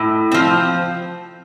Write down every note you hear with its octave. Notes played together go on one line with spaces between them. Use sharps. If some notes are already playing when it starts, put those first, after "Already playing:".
Already playing: A2
F3 C4